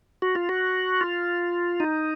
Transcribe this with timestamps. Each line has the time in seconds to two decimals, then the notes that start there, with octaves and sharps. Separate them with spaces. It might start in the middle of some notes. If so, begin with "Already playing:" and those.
0.22 F#4
0.35 F4
0.49 F#4
1.01 F4
1.80 D#4